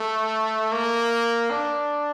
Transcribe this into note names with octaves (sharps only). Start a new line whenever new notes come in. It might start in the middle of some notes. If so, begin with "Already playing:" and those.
Already playing: A3
A#3
D4